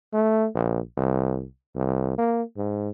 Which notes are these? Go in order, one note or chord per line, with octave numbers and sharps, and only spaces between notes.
A3
A#1
C2
C2
A#3
G#2